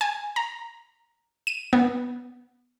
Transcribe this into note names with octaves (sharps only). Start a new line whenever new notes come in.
G#5
A#5
D#7
B3